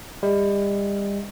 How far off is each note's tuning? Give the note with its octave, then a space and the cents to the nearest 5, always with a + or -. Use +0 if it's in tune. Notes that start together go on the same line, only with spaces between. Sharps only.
G3 +35 D#5 +35